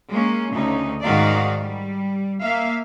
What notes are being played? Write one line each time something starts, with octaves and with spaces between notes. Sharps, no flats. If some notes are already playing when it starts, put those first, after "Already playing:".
G#3 A#3 C#4
D2 C#3 C#4 D#4
G#2 D#3 D#4 F#4 D5 F5
G3
A#3 E5 F5